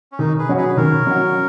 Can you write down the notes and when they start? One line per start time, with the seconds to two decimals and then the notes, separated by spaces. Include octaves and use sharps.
0.12 C#4
0.19 D#3 D#4
0.39 G#4 B4
0.49 F#3 C#4 F#4
0.58 G#4 B4
0.68 B4
0.77 D#3 A#4 C#5
1.07 F#3 C#4 F#4